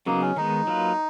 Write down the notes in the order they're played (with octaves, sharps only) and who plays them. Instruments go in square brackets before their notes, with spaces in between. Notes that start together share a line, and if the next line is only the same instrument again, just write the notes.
[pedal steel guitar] C#3 F#3 B3 D#4 G#4 [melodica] A#3
[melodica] C#4
[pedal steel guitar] D#3 G#3 B3 [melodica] D#4
[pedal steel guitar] F#3 A#3 F4 B4